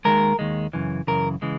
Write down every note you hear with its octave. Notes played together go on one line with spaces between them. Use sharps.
D#2 D#3 G#3 A#4
D#2 D#3 G#3
F#2 C#3 E3
F#2 C#3 E3 A#4
C#3 E3 G#3